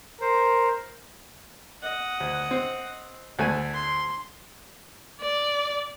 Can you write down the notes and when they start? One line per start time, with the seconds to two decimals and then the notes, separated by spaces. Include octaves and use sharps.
0.21 A#4 C5
1.83 D#5 F#5
2.20 D2
2.51 C4
3.39 D2 A3 D4 G#5
3.74 C6
5.21 D5